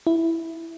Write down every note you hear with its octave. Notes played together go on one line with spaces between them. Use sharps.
E4